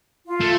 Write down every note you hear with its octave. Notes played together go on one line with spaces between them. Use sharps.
F4
A3